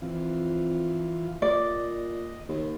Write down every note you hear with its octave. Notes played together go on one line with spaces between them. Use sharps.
F2 E3 F4
A#2 D5 D#5
D#2